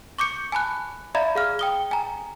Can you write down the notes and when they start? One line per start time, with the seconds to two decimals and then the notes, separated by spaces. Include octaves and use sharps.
0.19 C#6 D6 G6 C#7
0.52 G#5 A5 B5 F#6
1.15 D5 E5 F5 A#5 B5 G#6
1.35 G#4 F5 F6
1.59 G5 D#6 G7
1.91 G#5 A#5